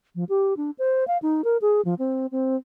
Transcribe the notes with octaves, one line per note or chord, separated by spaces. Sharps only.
F3
G4
D4
C5
F5
D#4
A#4
G#4
F3
C4
C4